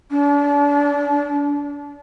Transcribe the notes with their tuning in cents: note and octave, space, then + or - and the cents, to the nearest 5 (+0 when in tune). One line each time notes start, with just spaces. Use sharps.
D4 -35